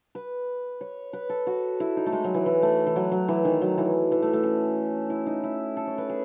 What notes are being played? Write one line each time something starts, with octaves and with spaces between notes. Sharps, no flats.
B4
C#5
B4
A4
F#4
E4
D#4
A3
G#3
F#3
E3
E3
A3
E3
F#3
F#3
E3
D#3
F#3
E3
E3
A3
A3
C#4
E4
D#4
E4
A4
C#5
B4
G#4